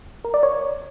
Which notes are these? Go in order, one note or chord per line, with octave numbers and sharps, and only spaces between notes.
A#4
D5
C#5